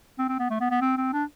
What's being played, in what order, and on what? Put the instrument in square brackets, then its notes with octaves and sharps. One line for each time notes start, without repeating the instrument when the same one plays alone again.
[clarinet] C4
C4
B3
A3
B3
B3
C4
C4
D4